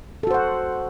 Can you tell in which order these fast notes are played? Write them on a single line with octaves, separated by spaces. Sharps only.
A4 F#4 C5 F#5